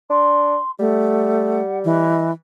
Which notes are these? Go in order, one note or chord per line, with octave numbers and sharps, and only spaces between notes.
D4 C6
G3 A3 F#5
E3 D#5